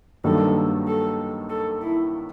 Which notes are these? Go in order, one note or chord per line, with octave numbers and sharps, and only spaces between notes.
G2 D#3 F#3 A#3 A4
A4
A4
E4